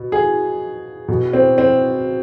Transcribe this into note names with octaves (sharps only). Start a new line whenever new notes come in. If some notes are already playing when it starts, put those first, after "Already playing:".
Already playing: B2
G#4
B2
C4
C4